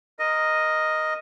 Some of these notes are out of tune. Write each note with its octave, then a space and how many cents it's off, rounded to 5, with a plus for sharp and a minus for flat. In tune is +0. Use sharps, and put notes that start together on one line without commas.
A#4 +0 D#5 +0